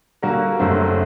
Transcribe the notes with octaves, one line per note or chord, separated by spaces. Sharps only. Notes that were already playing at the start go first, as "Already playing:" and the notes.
D3 G3 A#3 F#4 A#4
F#1 F#2 D3 A3 C4